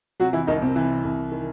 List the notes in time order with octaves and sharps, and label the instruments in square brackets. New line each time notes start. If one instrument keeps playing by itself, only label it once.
[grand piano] C3 F#3 F#4
E3 E4
C2 D#3 D#4
C3 C4
E3
C2
D#3